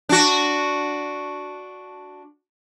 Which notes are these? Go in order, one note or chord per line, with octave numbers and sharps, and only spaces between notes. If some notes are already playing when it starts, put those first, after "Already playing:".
D4 F#4